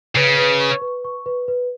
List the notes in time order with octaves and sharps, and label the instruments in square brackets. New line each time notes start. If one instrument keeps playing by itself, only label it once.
[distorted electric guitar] C#3 [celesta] B4
[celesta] B4
C#6
B4
C#6
B4
B4